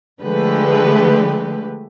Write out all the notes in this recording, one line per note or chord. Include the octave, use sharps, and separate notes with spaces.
D3 F3 G#3 A3 G4 B4